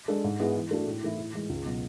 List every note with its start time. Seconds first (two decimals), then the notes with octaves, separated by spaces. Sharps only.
0.08 G#3 D4 A4
0.24 G#2
0.40 G#3 B3 E4 G#4
0.56 E3
0.71 A3 D4 F#4 A4
0.87 A2
1.03 E3 A3 E4
1.18 A2
1.33 E3 G#3
1.50 C#2
1.65 B2 F#3